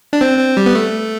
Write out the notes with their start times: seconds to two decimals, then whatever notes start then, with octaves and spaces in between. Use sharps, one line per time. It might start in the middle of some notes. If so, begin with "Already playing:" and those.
0.13 D4
0.21 C4
0.39 C4
0.57 G3
0.66 B3
0.75 A3